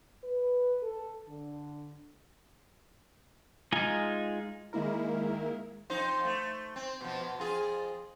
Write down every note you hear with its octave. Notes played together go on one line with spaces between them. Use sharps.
B4
A4
D3
G#3 D#4 F4 G#5
D#3 G#3 A#3 E4 A#4
F2 D#4 C5
A3
C4
B2 F3
B2
F2 F4 G#4